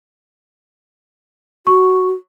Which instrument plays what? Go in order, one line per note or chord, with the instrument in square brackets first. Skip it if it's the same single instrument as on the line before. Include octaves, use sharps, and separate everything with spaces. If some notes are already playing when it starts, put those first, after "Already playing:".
[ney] F#4 [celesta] C#6